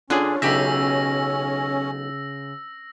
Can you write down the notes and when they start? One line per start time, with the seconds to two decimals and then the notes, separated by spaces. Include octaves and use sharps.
0.10 D3 C#4 D4 F4 G#4 B4
0.42 B1 C#3 G4 C5 E5 E6 A#6